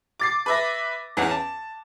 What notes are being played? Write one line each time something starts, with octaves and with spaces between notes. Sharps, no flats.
D6 A6 C7
B4 E5 A#6
E2 E3 C#4 F#5
A5